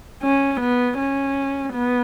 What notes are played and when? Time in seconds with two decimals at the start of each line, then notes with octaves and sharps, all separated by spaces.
0.23 C#4
0.61 B3
0.98 C#4
1.73 B3